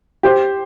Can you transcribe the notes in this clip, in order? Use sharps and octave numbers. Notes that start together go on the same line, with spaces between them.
G4 C5